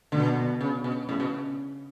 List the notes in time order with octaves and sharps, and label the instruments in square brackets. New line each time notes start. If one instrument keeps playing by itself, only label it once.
[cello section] B2 [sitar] D3
[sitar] C#3
B2
[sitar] A2 [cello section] C#3
[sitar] B2